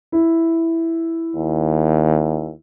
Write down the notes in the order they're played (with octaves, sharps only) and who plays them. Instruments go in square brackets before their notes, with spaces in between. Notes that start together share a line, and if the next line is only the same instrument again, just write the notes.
[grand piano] E4
[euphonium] D#2